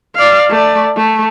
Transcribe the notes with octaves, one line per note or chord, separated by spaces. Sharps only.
D5 F5
A3 D5
A3